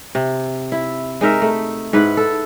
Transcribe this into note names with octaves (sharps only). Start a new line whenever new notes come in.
C3
E4
G#3 D#4 A#4 E5
A3
G#2 E4 B4 F#5
A4